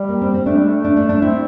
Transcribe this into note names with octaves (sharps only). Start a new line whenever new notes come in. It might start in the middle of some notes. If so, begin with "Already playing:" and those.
Already playing: G3
A#3
C4
C4
A3 D4
G3
A3
D4
D4
D4
C4 E4